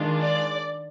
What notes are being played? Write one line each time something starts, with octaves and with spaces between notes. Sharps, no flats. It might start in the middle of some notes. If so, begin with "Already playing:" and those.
Already playing: D#3 G#3 D4 F4
D5